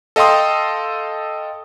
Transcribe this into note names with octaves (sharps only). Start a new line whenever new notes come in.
A4 D#5 F5 G5 C6 D#6